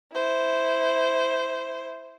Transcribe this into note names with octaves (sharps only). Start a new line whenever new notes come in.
E4 C5